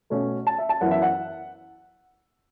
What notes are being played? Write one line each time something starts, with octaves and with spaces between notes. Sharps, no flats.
B2 A3 C#4
A5
E5
A5
F#2 E3 B3 F#5
E5
F#5